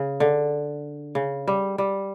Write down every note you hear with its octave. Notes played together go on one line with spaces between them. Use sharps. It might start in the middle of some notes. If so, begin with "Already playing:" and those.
Already playing: C#3
D3
C#3
G3
G3